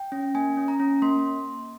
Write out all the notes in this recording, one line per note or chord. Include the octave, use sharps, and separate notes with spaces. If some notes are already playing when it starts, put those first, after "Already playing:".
Already playing: G5
C#4
A#3 G#5
C#4
A#5
C#4
A#3 C6